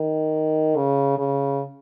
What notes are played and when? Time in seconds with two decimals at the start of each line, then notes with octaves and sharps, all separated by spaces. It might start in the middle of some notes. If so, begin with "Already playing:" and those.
Already playing: D#3
0.76 C#3
1.18 C#3